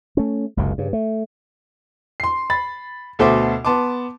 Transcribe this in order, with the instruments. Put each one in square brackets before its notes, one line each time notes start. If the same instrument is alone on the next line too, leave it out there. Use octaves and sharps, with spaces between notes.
[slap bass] A3 C#4
F#1 C#2 F#2 C3
G2 C#3
A3
[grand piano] C6 C7
B5 A6
D2 B2 A4 C5 E5 D6
B3 A5 C6 D6